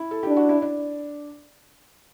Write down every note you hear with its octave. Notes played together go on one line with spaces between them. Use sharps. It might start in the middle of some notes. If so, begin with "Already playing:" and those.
Already playing: E4
A4
D4 G4
F#4
E4
D4